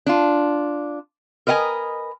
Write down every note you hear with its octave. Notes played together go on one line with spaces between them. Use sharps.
D4 F4
A#4 B4 D#5 F#5 G#5 A#5